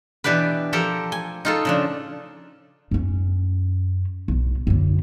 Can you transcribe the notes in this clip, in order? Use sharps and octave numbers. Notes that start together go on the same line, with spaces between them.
B2 E3 D4 G4 B4
F3 G4 A4 A#4
G#5
D#4 F4 A4
C#3 F3 D4
F#2 C#4
B1 A#2
F#2 D3